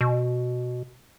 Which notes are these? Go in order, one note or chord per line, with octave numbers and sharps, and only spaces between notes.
B2